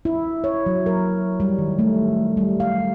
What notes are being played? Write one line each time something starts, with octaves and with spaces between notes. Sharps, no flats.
E4
C#5
F#3
A#4
G3
D#3
A3
G3
F5